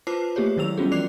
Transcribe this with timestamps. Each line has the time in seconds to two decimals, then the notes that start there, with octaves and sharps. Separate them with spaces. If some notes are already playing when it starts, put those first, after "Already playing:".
0.07 F4 B4 C5 A5 D6 C7
0.36 A3 A#3 G4 G#4 C#5
0.57 D#3 F#3 G#3 E4 E6 F7
0.78 G3 B3 C#4 F4 F#4 G#4
0.91 E3 D5 D6 F#6 C7 F7